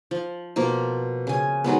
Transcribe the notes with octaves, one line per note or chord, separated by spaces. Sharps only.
F3
B2 F3 A#3
C#3 G#5
D#3 F#3 G#3 B3